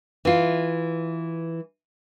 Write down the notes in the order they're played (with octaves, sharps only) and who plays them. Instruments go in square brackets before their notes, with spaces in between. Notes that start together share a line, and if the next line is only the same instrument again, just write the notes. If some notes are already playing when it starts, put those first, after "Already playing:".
[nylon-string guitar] E3 F4